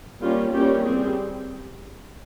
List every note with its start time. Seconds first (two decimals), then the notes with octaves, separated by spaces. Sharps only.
0.21 G3 A#3 C#4 F4
0.53 E3 G3 A#3 C#4 G4
0.84 G3 C4 G#4